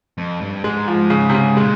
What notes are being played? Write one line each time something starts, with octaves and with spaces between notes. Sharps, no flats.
F2
G2
G#2 G#3
F3
C#3
C3
C#3
A#2 G#3